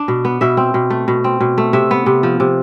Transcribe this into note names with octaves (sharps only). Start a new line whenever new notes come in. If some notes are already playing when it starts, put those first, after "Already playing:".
Already playing: D4
B2
B3
B2 E5
C4
B2
A3
B2
C4
B2
A3
C3 E5
B3
C3
F3
C3